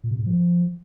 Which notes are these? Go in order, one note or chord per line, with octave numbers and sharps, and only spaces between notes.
A#2
C3
G#2
F3